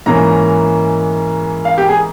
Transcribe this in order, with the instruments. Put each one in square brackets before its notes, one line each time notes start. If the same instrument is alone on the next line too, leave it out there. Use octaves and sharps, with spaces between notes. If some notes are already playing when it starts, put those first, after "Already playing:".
[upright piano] G#2 E3 A#3 C#4 A#5
F5
G4
G#4